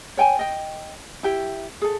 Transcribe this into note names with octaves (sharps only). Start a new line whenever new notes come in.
C#5 G5 G#5
D#5 G5
E4 G4 G5
G#4 A4